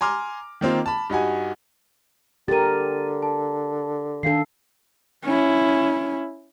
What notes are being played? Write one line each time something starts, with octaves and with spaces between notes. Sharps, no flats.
G#5 A#5 C6 D6 F6
D#3 A#3 C4 F4
A5 B5
G2 D#4 F#4 G#5
D3 G4 A#4 A6 D#7
A5
D#3 D4 A4 F5 C7
C#4 E4